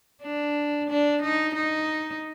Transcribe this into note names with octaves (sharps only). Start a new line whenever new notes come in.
D4
D4
D#4
D#4